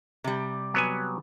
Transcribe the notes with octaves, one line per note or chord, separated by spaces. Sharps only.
C3 G3
F#3 B3 G#5